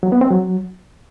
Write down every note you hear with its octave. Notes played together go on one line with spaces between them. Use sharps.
F#3
B3
C4
F#3